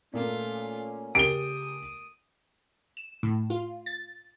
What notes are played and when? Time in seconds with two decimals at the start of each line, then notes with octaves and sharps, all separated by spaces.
0.13 A#2 A3 A#3 C#4 F4
1.15 C#3 G4 A#4 D#6 D7 G7
2.97 E7
3.23 A2
3.50 F4
3.86 A6